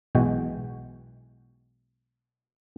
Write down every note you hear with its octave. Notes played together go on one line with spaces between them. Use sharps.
B1 B2 E3 G#3 F#4 G5